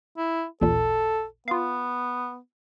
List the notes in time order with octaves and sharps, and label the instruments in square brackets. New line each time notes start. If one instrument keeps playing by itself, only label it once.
[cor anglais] E4
[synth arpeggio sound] A1 D#2 A#2 [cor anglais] A4
[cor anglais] B3 [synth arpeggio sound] F4 F5